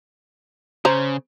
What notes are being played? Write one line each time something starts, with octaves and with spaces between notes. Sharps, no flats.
C#3 C5 A#5